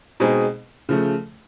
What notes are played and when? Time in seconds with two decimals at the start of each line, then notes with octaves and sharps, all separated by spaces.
0.20 B2 G#3 C4 D#4 G#4
0.89 C#3 F3 A3